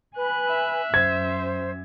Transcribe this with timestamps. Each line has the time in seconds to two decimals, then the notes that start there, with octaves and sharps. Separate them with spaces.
0.16 B4 G#5 F#6
0.48 E5
0.94 F#2 C5 G#6